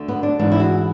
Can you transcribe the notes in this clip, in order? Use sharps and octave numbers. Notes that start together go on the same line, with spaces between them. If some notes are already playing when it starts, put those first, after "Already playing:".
Already playing: D2 D3
B3
D4
G#2 E3 D4
E4
F#4